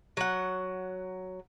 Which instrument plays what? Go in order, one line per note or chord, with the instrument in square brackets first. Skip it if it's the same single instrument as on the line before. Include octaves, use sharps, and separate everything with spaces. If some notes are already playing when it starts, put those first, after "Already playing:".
[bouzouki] F#3 F#5